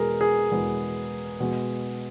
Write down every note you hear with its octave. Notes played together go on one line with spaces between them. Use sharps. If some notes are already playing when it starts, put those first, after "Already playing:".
Already playing: E2 B2 G#3 B3 G#4 A#4
G#4
E2 B2 G#3 B3
B2 G#3 B3